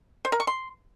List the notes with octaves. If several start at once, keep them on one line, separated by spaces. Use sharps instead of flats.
C5
A#4
C#6
C6